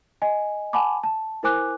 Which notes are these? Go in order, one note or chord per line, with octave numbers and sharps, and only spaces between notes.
D#5 G#5
F#5 G#5 A5 B5 D6
A5
E4 A#4 C5 G#5 D6 F#6